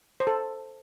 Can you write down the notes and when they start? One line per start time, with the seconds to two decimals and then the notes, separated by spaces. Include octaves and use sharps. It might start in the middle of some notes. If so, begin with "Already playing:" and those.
0.20 C5
0.27 A4